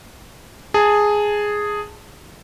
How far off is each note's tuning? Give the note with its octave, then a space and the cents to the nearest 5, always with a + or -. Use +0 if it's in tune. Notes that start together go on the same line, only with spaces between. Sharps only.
G#4 +0 A5 +15